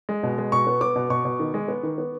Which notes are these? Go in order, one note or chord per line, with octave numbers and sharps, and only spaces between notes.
G#3
B2
G#3
B2 C#6
B3
B3 D6
B2
B2 C#6
B2
D#3
G#3
B3
D#3
B3